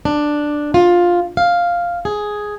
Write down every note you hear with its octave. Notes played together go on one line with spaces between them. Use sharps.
D4
F4
F5
G#4